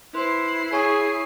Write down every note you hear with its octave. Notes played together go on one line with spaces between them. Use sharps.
E4 B4 C5 C6 C7
G#4 C#5 G#5 C#6